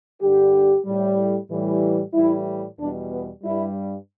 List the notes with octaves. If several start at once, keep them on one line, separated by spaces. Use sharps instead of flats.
G2 D3 G3 G4
A2 G3
A2 E3 G3
A2 E3 G3 E4
E2 B2 G3 D4
B3
G2 G3 E4